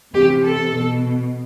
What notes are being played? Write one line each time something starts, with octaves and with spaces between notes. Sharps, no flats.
C3 E3 G4
A4
B2